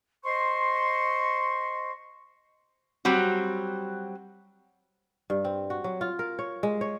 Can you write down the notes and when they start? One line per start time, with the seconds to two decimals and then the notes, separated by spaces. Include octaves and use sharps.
0.23 C5 D#5 C6 C#6
3.05 F#3 G3 C4 F#4
5.30 G2
5.45 C4
5.70 F#4
5.84 F#3
6.01 F4
6.19 A#4
6.39 C#5
6.63 G#3
6.81 C#5